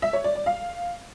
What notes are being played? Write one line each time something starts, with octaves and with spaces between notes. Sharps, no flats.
E5
C#5
D5
D5
F5